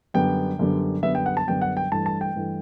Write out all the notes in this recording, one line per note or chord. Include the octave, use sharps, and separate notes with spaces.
F#2 D3 G3 B3 G5
F#2 D3 G3 B3
F#2 D3 G3 B3 E5
G5
F#5
A5
F#2 D3 G3 B3 G5
F#5
G5
G2 E3 A3 A5
A5
G5
G2 E3 A3